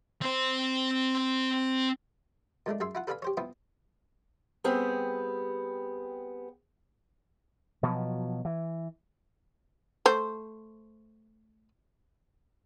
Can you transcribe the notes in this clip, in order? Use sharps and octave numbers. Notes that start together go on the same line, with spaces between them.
C4 C5
A#2 G#3 A3 D4
F#2 G#4 E5 G#5 C6
E4 F4 F#5
A4 B4 D5 F5 G#5 B5
G4 C5 C#5
B3 C4 E4 F4 D#6
G3 B3 C4 G4 G#4
B2 F3 F#3
E3
A3 C5